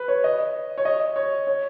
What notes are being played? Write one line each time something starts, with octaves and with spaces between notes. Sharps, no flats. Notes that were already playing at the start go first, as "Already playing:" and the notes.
Already playing: B4
C#5
D#5
C#5
D#5
C#5
C#5